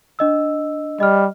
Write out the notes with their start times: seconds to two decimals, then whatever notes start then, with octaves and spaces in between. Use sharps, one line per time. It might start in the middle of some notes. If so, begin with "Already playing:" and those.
0.19 D4 D#5 E6
1.00 G3 D#5 F6